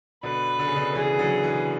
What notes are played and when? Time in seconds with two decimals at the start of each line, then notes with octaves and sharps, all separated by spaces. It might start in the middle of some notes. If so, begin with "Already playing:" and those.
0.23 B2 D3 B4
0.59 D3
0.67 C#3
0.76 B2 D3
0.95 C#3 E3 G#4
1.19 D3 F#3
1.43 C#3 E3